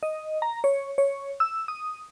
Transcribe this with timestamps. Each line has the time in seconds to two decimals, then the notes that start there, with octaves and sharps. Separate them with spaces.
0.03 D#5
0.42 A#5
0.64 C#5
0.98 C#5
1.40 E6
1.68 D#6